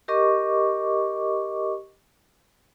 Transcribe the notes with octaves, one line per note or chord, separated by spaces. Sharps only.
G4 A#4 D#5 C#6 D6